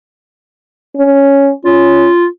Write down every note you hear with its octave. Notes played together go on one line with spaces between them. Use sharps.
C#4
C#4 F4